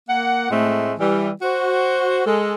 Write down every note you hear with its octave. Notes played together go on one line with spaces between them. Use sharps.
A#3 F#5
A2 G#3 A3 C4
E3 G3
F#4 C5
G#3 A4